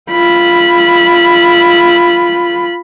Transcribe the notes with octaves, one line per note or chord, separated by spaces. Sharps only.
F4 B5